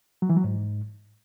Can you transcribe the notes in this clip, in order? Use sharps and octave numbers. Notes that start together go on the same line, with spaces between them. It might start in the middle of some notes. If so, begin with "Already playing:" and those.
F#3
E3
F#3
G#2